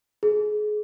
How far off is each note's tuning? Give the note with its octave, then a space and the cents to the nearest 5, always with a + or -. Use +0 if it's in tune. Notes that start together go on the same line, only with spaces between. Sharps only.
G#4 +25